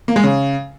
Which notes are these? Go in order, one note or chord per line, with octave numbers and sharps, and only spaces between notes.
A#3
G#3
C#3